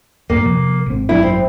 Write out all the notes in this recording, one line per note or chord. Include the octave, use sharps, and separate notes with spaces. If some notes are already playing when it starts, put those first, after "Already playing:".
E2 G2 A#3
C3 F3
G#1 C4
G#1 F#2 F#3 E4
C4